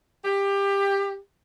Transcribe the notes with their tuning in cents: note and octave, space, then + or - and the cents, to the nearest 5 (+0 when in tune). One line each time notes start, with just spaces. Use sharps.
G4 +20